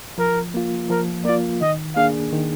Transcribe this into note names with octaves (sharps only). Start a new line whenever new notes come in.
F3 A#4
A#3 F4
F3 A#4
A#3 F4 D5
D#3 D#5
A#3 D4 G#4 F5
D#3